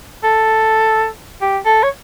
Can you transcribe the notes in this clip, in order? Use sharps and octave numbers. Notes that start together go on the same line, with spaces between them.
A4
G4
A4
C#5